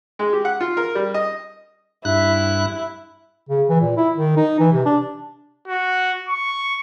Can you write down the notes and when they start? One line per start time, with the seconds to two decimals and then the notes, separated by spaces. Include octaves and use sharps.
0.19 G#3
0.33 G4
0.45 F#5
0.61 F4
0.77 A#4
0.95 G3
1.14 D#5
2.05 G2 E4 F#6
3.49 C#3
3.69 E3
3.81 A#2
3.97 E4
4.18 D#3
4.37 D#4
4.60 E3
4.72 C3
4.86 D4
5.68 F#4
6.29 C#6